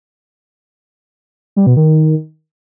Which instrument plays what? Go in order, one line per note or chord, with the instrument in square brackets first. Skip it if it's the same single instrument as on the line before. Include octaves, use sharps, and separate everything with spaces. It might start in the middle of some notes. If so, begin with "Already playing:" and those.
[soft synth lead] G3
B2
D#3